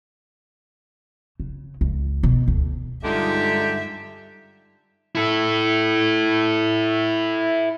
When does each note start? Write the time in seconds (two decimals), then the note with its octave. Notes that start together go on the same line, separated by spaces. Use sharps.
1.40 C#3
1.81 C#2
2.23 B2
2.48 D2
3.04 G2 D3 G#3 D#4 F4 G4 E5
5.15 E4 A4